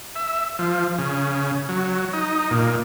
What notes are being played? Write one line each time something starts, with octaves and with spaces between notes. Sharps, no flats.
E5
F3
C#3
F#3
D#4
A#2